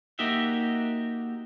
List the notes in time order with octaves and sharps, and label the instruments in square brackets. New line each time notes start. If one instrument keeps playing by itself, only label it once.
[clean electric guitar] A#3 D#4 F#4 G4 E5